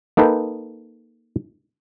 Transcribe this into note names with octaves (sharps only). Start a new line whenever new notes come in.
A#3 D#4 A4 B4 G5